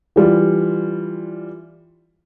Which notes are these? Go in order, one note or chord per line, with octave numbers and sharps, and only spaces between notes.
E3 G3 F4